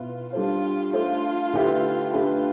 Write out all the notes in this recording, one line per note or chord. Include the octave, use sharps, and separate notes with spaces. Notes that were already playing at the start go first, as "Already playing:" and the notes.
Already playing: B2 B3 E4 F4 B4
G3 D4 F4 A4 C5
A3 D4 F4 A4 C5
D3 A3 E4 G4 B4
A3 D4 F4 G4 B4